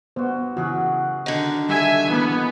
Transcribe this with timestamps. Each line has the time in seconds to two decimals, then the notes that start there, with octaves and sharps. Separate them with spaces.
0.16 G2 B3 F#4 C5
0.57 F#2 C#3 E3 F#4 G#4 F#5
1.26 D3 D#3
1.69 G3 A4 E5 G#5
2.08 E3 A#3 B3 G#4 B4